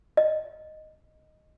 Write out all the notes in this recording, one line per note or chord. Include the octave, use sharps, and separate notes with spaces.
D#5